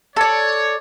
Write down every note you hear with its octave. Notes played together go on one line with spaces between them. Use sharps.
A4 C#5 D5